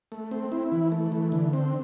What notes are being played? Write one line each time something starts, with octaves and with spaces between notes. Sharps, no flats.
A3
C4
E4
E3
A3
E3
D3
C4